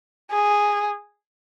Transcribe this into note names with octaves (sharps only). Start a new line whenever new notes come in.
G#4